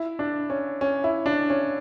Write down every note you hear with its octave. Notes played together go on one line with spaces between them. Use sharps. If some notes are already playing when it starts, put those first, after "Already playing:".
Already playing: E4
D4
C#4
C#4
E4
D4
C#4